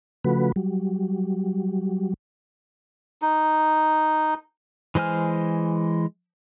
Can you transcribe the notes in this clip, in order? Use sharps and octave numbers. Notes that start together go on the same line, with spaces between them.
C#3 F3 A3 F#4 B4
F#3 G3
D#4
E3 G#3 C5 G#5 F6